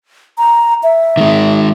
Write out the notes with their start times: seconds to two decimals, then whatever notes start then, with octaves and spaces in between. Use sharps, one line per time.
0.38 A#5
0.83 E5
1.17 D#3 G#3